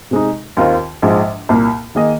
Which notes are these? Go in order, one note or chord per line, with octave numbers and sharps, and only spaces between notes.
C3 G#3 D#4
D#2 D#3 C4 F4 A#4
A#1 G#2 F3 G#3
C2 A#2 A#3
D#3 A#3 G#4 D#5